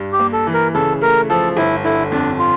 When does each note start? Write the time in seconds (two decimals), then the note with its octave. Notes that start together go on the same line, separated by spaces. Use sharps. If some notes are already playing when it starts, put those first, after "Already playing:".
Already playing: G2
0.13 G4
0.19 A#3
0.33 A4
0.47 E3
0.54 A#4
0.74 C#3 A4
1.01 A3 A#4
1.30 F3 A4
1.57 G1 E4
1.84 D3 E4
2.12 F2 D4
2.39 F4